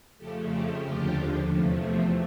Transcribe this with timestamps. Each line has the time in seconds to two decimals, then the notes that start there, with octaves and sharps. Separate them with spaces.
0.18 F2 C#3 F3 A3 G4 A4
0.50 F4 G4
0.82 D#2 D3 F3 F4 G4
1.47 E2 C3 F3 A3